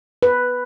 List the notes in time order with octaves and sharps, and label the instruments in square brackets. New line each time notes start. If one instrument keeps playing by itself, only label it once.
[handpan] B4